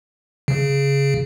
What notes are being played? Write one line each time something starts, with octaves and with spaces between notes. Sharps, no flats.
C#3